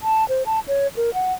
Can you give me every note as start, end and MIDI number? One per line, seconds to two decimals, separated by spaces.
0.03 0.27 81
0.29 0.43 72
0.46 0.60 81
0.68 0.87 73
0.97 1.13 70
1.14 1.33 78